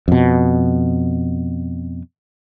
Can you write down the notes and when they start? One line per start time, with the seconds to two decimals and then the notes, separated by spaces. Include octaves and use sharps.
0.08 F2 B2